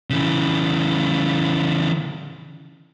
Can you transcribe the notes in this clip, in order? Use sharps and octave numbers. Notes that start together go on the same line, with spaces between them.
C#3 E3